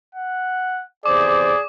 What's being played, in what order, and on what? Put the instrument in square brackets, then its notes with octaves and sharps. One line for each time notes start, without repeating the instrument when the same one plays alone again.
[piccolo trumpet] F#5
[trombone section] E2 C3 C5 [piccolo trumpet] G#4 [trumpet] D5 [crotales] D6